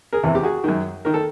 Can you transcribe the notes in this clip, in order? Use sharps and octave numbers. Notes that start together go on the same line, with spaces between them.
G#4 A#4
E2 C3 E3
G4
F#4 G#4
F#2 D#3
D#3 A#4
A4